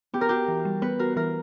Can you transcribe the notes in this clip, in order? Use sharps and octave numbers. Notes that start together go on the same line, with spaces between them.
B3 G4
A#4
F#4 G4
E3
G3
B3 B4
F#4 A#4
E3 A#4